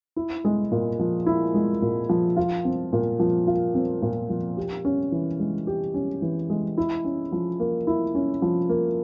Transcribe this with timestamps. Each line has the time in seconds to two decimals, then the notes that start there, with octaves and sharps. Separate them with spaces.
0.16 E4
0.45 G#3
0.72 A#2
0.99 F3
1.26 E4
1.54 G#3
1.82 A#2
2.09 F3
2.37 F4
2.65 C4
2.93 A#2
3.20 F3
3.47 F4
3.74 C4
4.02 A#2
4.30 F3
4.57 G4
4.85 C#4
5.12 E3
5.40 G#3
5.67 G4
5.94 C#4
6.22 E3
6.50 G#3
6.78 E4
7.05 C#4
7.32 F3
7.60 A#3
7.87 E4
8.15 C#4
8.42 F3
8.69 A#3